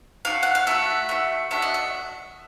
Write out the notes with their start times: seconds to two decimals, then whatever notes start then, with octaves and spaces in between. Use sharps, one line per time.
0.25 D4 F#4 F5
0.30 A3
0.43 F#5
0.55 F5
0.67 A3 D4 F#4 E5
1.09 A3 D4 F#4
1.51 A3 D4 F#4 E5
1.62 D#5
1.74 E5